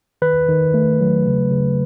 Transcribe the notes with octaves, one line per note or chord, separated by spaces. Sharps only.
D#3 B4
D#3
A3
F#3
C#3
C#3